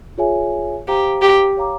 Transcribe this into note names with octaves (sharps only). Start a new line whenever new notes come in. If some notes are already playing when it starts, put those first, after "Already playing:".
F4 G#4 C#5 E5 G#5
G4 C5 F5 A#5
G4
C#5 F5 A#5 D6